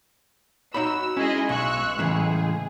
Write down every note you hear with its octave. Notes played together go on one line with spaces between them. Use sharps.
D#4 F#4 C#5 B5 E6
G#3 C#4 E4 G#4 D#5
B1 C#6 E6 F#6
A2 C#3 E3 G#4